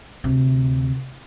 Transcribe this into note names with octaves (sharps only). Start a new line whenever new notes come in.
D2 C3